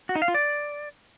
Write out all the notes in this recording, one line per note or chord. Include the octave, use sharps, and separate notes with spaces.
F#4
D#4
F5
F4
D5